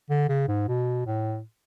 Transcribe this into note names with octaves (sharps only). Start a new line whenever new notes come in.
D3
C#3
G#2
B2
A2